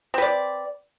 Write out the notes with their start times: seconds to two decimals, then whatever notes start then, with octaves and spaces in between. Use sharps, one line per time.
0.14 C4
0.18 B4
0.22 D5